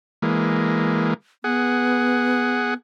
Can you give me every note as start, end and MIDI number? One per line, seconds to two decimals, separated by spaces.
0.22 1.14 52
0.22 1.14 56
0.22 1.14 58
1.44 2.75 59
1.44 2.74 68
1.44 2.74 78